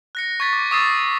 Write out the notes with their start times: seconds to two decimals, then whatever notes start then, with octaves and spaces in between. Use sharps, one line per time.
0.15 F#6 A#6 C#7
0.40 C#6 G#6 A6 B6
0.53 D6
0.71 C#6 D#6 E6 A6 C7